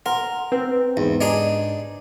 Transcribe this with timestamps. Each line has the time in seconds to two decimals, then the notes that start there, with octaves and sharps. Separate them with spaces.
0.06 A#4 F#5 C6
0.52 C4 B4
0.97 E2 G#2
1.21 D4 D#4 G#4